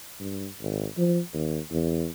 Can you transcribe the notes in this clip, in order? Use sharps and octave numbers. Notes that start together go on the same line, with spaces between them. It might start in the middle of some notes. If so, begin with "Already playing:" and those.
G2
G#1
F3
D#2
E2